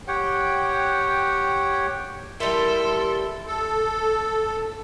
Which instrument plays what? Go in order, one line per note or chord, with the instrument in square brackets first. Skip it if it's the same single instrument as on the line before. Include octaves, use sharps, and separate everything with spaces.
[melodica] G4 C#5 F#5 G5
[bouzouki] G3 E4 [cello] A4 [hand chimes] A#4 [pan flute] C6
[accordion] A4